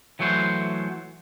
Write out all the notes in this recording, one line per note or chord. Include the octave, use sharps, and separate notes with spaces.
E3 F#3 A3 F#4 C5